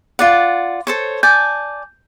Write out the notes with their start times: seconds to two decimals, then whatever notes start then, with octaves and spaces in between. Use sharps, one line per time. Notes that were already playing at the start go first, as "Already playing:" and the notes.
0.19 F4 D5 F#5
0.87 A4 C5 C#5
1.23 D5 G#5 A5 G6